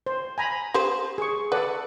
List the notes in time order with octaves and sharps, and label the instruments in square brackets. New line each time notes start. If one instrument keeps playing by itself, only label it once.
[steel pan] C5
G#5 A#5 B5
[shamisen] G4 B4 C5
[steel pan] G#4 C#6
[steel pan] A4 D5 F#5 [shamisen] B4